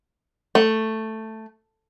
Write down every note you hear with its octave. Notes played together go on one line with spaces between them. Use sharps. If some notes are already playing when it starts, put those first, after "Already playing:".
A3